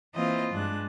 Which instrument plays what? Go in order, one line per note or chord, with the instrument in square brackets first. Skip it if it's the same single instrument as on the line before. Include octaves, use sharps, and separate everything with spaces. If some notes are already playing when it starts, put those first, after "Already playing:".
[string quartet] E3 A#3 C4 F4 D#5
G2 G#3 D4 F#6